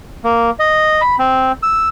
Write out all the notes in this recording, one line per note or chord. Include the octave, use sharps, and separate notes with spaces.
A#3
D#5
B5
C4
E6